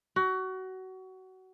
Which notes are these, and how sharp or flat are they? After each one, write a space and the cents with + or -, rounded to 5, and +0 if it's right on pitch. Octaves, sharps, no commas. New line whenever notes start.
F#4 +25